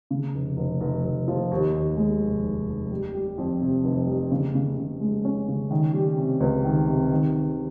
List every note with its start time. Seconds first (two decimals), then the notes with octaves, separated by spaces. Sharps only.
0.11 C#3
0.34 F1
0.57 F1
0.81 F1
1.04 F1
1.28 F3
1.51 D#2
1.75 D#2
1.97 G#3
2.21 F1
2.45 F1
2.68 F1
2.91 G3
3.14 G3
3.38 F2
3.61 C3
3.84 F1
4.07 G3
4.32 C#3
4.55 C#3
4.77 C#3
5.01 G#3
5.25 C#4
5.48 C#3
5.71 D#3
5.94 G3
6.17 C3
6.40 C#2
6.64 D#3
6.87 C3
7.12 D#3
7.34 D#3